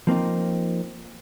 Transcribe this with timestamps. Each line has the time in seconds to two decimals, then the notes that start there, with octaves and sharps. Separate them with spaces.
0.07 F3 A#3 C4 D#4